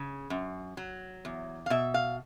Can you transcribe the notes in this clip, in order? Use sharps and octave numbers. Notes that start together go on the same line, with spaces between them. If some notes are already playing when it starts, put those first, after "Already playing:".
Already playing: C#3
F#2
F#3
E2
F5
B2 E5
F5